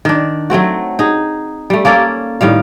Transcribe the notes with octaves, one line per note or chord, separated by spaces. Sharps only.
D#3 D4
F#3 A3 C4 F#4
D#4 G#4
G3 A3
A#3 C#4 A4 D5
A2 D#3 G3 F5